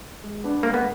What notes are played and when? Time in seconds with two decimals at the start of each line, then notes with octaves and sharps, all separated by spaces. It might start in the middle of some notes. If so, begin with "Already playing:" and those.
0.23 G#3
0.44 B3 D4
0.63 G#3 A#3
0.74 B3